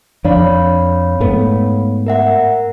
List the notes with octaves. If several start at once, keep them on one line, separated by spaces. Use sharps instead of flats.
F2 D4 C#5 F5 B5
G#2 A3 B3
A#4 E5 F#5